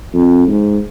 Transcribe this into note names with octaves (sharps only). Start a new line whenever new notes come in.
F2
G#2